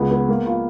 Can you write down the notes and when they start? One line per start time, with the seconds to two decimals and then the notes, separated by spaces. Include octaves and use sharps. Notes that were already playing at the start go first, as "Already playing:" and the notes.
Already playing: C#2 B3
0.11 B3
0.29 A#3
0.46 F4